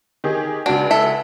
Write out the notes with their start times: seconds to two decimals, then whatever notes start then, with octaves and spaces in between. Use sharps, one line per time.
0.24 D#3 G4 G#4
0.66 C#2 D4 F#4
0.91 A4 E5